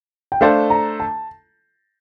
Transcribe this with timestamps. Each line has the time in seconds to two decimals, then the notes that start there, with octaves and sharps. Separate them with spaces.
0.32 G5
0.41 A3 D4 A4 C5 F5
0.70 A#5
1.00 A5